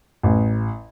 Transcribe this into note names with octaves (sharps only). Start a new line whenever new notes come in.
A1